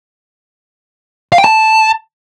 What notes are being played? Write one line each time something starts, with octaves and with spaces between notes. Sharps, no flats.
F5
G5
A5